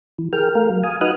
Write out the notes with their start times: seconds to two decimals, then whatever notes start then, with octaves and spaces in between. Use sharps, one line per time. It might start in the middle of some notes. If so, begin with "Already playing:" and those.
0.19 E3
0.33 G#4 A#4 G5 F6
0.55 A3 A#4 F5
0.70 F#3
0.83 F5 G#5 D#6
1.01 D#4 F#4 B4 D#6 F6 F#6